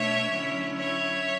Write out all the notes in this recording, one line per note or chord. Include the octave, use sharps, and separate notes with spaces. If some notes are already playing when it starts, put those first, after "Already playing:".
Already playing: B2 A3 D4 C#5 E5
D3 F#3 C#4 E4
C#5 E5